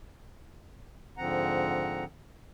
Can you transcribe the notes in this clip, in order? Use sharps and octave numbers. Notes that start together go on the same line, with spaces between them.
G#2 D3 F3 C4 F#5 A#5